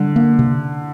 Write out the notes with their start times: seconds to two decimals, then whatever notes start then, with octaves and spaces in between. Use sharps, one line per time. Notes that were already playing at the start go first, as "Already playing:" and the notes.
Already playing: D3 G3
0.16 A#3
0.39 C3